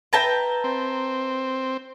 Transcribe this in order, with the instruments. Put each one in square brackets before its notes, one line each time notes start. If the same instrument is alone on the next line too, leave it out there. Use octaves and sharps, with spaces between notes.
[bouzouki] B4 E5 [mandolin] G5 A5 A#5
[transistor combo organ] C4